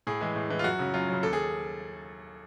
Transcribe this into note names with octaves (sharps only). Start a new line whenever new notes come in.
A2 G#4
E3 G#3
A2
E3 G#3
F4
F#2 F#4
C#3 F#3
F#2 F4
C#3 F#3
D#2 A4
G#4